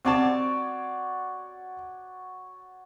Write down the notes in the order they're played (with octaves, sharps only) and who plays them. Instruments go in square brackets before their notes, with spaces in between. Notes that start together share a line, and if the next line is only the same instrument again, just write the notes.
[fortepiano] C3 C4 A5 [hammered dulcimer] F#4 C#5 D5